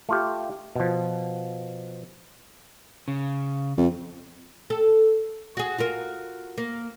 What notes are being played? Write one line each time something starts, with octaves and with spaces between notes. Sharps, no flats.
A3 F4 G4
B2 F3
C#3
F2
A4
F#4 G#4
F4 F#4 A#4
A#3